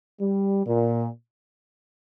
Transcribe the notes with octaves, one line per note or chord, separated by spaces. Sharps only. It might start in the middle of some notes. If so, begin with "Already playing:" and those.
G3
A#2